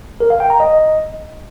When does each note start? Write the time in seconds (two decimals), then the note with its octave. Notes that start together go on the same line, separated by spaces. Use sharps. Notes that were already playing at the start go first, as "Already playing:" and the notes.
0.20 A#4
0.30 F5
0.40 G5
0.50 A#5
0.60 D#5